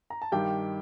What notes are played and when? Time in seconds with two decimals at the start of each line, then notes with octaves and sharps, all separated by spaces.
0.10 A#5
0.22 A5
0.32 G2 D#3 G4 G5